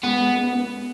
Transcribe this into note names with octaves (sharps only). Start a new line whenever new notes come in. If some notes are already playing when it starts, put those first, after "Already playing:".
G#3 B3
G#3
B3
B3